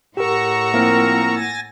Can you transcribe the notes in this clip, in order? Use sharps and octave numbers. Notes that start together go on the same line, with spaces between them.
A2 G4 A#4 F#5 A#5 C#6 E6
F3 A#3 C4 E4 A#4
G#5 A6 A#6